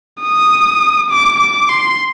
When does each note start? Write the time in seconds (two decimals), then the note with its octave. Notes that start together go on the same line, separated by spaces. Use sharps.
0.21 D#6
1.10 D6
1.40 D6
1.69 C6